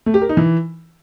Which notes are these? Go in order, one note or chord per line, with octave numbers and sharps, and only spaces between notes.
A3
G4
A#4
D#4
E3